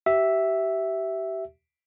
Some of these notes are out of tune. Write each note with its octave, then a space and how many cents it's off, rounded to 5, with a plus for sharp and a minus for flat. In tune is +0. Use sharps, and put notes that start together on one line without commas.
G4 -30 E5 +0